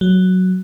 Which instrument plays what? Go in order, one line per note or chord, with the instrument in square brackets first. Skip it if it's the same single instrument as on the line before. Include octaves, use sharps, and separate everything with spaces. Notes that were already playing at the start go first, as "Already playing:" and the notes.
[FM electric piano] F#3